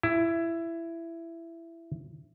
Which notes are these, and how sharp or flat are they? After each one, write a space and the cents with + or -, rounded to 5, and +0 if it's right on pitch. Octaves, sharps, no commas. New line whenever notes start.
E4 +15